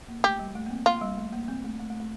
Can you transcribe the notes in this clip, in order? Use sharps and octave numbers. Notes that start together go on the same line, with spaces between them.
A#3
A3 G4
G3
A3
A#3
C4
A#3 F4
G3
A3
A#3
C4
A3
A3
A3
A3